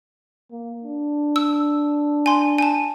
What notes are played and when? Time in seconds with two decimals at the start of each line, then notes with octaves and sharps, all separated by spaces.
0.51 A#3
0.84 D4
1.36 E6
2.26 G#5 C6
2.58 G#5 A5